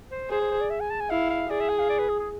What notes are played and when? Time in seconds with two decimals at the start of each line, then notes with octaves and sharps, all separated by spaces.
0.11 C5
0.30 G#4 C5
0.41 C5
0.51 C5
0.61 D5
0.70 E5
0.80 G#5
0.90 A5
1.00 G#5
1.10 E4 F5
1.30 F5
1.50 G#4 D5
1.60 E5
1.69 G#5
1.79 F5
1.89 D5
1.99 B4
2.09 G#4
2.19 G#4